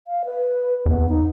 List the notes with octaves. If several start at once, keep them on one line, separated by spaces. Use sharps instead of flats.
F5
B4
E2 B3
D#4